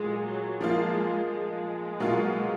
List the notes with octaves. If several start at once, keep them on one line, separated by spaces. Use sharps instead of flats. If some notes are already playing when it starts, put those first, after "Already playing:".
Already playing: A#2 F#3 G#3
F#3
F3 G#3 A#3 F4
G#3
B2 F#3 A#3 F4